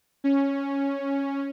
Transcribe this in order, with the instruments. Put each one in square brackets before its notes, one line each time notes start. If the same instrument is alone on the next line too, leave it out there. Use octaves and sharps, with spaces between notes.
[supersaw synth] C#4